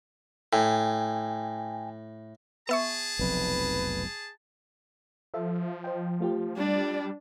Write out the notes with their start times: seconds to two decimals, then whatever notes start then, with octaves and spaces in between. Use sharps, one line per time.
0.53 A2 G5 G#5
2.69 B3 G#4 E5 A5 C#6
3.19 F1 B1 F2 B4
5.34 F3 A4 E5 F5
5.84 C5 D#5 G5
6.20 A3 F4 G4
6.57 G3 D4 D5